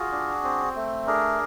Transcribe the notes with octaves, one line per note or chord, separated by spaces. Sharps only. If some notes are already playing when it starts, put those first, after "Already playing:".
Already playing: F4 F#4 G#4
D4
C4
A3
D4 G#4 A#4